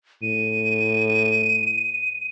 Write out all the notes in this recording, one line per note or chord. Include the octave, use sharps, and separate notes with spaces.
A2 D#7